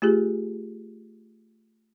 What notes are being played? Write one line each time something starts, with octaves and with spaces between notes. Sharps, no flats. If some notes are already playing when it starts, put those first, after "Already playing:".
A3 F4 G4 G#4